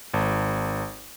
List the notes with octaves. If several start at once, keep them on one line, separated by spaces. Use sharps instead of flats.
G#1